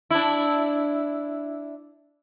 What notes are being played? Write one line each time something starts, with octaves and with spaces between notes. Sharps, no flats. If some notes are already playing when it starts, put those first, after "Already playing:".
D4 E4